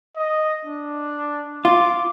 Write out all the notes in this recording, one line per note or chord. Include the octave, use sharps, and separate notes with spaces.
D#5
D4
F4 D6